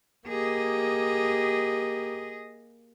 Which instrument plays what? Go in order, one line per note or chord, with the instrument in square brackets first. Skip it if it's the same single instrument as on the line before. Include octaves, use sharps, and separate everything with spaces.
[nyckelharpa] A#3 G4 [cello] G#4 D#5